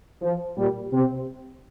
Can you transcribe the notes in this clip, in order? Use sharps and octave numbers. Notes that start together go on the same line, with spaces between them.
F3
A#2 G3
C3 C4